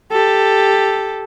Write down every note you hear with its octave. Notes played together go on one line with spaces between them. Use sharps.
G4 A4